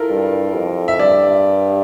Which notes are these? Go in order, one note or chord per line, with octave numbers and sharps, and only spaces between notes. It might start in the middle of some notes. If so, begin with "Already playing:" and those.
Already playing: E4 F4 A4 A#4
G2
F2
E5
G2 D5